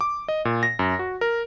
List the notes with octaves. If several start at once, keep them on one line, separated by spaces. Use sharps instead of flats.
D6
D#5
A#2
A#6
F#2
F#4
A#4